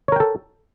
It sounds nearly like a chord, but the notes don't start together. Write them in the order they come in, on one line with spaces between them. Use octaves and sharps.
C#5 A#4 G5 A4